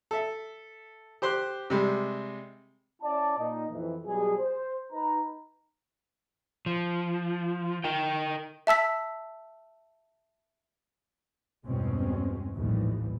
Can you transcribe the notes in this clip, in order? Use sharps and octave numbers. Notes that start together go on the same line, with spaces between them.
A4 E5
G4 C5 C6 D6 F#6
C3 G3 G#3
C#4 E4 D5 A5
A#2 D#4 D#5
F2 E3
B2 F#3 G3 G#4
C5
D#4 B4 A#5
F3
D#4 A#4 G5
E5 A5 E6 B6
E2 G2 B2 G#3 C4 C#4
A#1 D#2 A2 E3 F3 G3